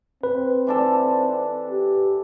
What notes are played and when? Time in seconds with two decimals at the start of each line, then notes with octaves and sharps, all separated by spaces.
0.23 C4 B4
0.67 E3 D4 A4
1.70 G4